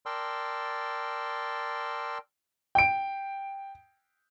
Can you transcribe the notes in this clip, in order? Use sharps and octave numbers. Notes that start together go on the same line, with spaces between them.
A#4 D5 G5 A5 C6 E6
G5 D7